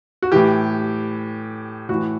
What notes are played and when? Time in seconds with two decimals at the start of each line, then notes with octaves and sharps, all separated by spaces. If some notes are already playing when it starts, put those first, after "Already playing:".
0.22 F#4
0.32 A2 E3 G4
1.89 A2 E3 F#4